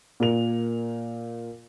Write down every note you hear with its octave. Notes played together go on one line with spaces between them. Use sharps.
A#2 A#4 F7